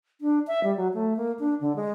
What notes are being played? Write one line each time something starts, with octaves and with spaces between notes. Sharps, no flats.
D4
E5
G3
F#3
A3
A#3
D4
D3
G#3